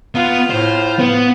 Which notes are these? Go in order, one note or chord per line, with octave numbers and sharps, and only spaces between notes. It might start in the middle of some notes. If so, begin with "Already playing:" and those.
B3 F4
A2 C5
B3